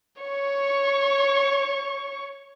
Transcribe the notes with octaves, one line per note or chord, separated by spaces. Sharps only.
C#5 C#6